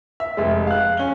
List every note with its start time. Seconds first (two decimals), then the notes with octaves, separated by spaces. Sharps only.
0.20 E5
0.37 F1 G#3
0.67 F5 F#6
0.97 C#4 G7